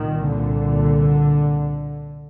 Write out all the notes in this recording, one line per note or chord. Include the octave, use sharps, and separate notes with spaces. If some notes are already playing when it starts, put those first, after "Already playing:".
Already playing: C2 A#2 D#3
D3